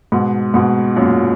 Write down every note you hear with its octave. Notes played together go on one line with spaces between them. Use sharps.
G#2 B2
G#2 B2
F#2 A#2